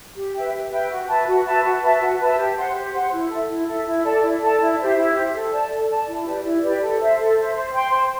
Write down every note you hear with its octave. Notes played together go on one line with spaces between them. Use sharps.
G4
B4 E5 G5
G4
B4 E5 G5
F#4
B4 E5 A5
F#4
B4 E5 A5
F#4
B4 E5 A5
F#4
B4 E5 A5
G4
C5 F#5 C6
G4
C5 F#5 C6
E4
A4 E5
E4
A4 E5
E4
A4 D5 A5
E4
A4 D5 A5
E4
G4 C5 E5
E4
G4 C5 E5
A4
D5 A5
A4
D5 A5
E4
G4 B4 D5
E4
G4 B4 D5
A4
C5 E5
A4
C5 E5
C5
G5 C6
C5